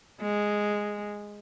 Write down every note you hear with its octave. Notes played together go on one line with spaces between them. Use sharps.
G#3